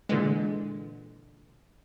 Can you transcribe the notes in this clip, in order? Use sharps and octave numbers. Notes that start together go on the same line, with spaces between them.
A#2 D3 E3 G#3